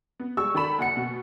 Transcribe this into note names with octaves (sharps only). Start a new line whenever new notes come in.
B3
G3 G#3 C#6 E6
D#3 A4 D5 B5 E7
F#1 F#5 C#7
B2